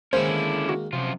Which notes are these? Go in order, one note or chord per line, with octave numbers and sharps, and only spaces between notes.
D#3 G#3 A#3 C#4 E4 G#4 A#4 C5
D3
F#4
F#2 C3 F3 F4